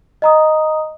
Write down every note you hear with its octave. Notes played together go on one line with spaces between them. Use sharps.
D#5 A#5 D#6